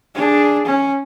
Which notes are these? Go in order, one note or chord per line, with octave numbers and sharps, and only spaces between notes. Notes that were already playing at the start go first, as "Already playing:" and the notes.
D4 G#4
C#4